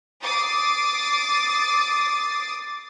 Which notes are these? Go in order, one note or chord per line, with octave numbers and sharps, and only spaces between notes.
D6 D#6 A6 C7